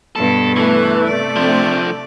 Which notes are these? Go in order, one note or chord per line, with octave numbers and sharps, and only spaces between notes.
G2 B2 A4
E3 A3 B4
C3 D5
F3 C4 D4